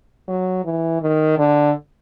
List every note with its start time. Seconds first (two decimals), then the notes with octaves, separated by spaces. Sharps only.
0.28 F#3
0.65 E3
1.01 D#3
1.38 D3